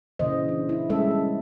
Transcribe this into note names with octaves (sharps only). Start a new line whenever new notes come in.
A#2 C#3 E3 C5 D#5
D4
E4
G3 G#3 A#3 C#4 A4 E5
C#4